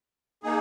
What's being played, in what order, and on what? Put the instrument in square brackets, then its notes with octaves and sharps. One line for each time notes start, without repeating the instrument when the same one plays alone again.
[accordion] A#3 D#4 G#4